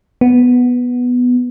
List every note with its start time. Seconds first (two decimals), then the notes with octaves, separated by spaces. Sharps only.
0.21 B3